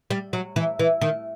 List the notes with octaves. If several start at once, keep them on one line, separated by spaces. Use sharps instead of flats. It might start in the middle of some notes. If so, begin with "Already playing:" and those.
G3
F#3
E3
E3
D#3